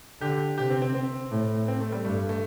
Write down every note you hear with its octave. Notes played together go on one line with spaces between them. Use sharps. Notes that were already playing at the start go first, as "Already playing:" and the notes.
D3 G4
C3 G4
C4
C4
C4
A2
C4
A3
G3
G2 A3
A3